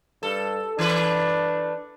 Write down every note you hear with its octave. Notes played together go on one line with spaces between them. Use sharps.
G2 A4
E3 A3 D4 B4